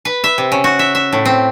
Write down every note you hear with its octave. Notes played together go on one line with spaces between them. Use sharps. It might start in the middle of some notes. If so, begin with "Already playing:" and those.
B4
E5
C3
C#3
F#4
E5
E5
A2
C4